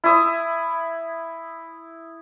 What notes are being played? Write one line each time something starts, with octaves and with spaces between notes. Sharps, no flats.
E4 D#6